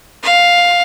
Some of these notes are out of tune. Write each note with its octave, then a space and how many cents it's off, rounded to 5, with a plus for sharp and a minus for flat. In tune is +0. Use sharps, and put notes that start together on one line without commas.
F5 +5